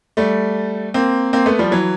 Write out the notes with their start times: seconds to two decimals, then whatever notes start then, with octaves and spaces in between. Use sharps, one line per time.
0.17 G3 A3
0.94 A#3 C4
1.33 A#3 C4
1.46 A3 B3
1.59 F3 G3
1.71 E3 F#3